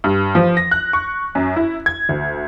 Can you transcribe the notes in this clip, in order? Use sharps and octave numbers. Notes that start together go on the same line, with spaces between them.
G2
F3
A#6
F#6
C#6
F#2
E4
G#6
D2